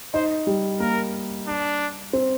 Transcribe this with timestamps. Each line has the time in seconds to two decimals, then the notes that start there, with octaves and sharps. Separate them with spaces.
0.14 D#4 C5
0.47 G3
0.80 A#3 A#4
1.47 D4
2.13 C4